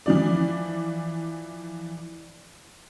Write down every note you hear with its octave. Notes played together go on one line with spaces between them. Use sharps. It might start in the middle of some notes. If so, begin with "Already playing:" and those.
E3 F3 D5